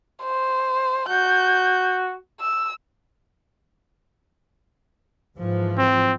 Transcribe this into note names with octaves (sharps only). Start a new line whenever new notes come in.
C5
F#4 G6
E6
G#2 E3 F3
C4